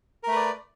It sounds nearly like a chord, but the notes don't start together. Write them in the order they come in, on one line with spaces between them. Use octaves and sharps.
A#4 A3 B4 D5